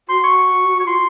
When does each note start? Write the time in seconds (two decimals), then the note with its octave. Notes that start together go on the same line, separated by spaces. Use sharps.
0.09 F#4 C6
0.24 C#6
0.80 C#6
0.86 F4 C6